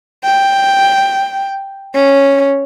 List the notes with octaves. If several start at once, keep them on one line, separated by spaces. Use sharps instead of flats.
G5
C#4